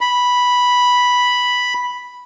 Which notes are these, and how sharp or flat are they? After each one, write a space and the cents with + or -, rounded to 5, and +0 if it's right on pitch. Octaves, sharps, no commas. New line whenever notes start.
B5 -5